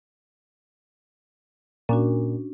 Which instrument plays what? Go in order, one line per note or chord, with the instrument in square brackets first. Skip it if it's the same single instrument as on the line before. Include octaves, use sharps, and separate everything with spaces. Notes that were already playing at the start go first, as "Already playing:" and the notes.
[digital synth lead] A#2 [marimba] C#4 D4 F#4